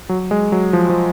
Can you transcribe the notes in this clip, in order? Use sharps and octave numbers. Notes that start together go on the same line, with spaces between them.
F#3
G#3
F#3
F3
F3